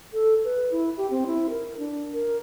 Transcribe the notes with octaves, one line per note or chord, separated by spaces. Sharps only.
A4
B4
E4
G4
C4
E4
A#4
D4
A#4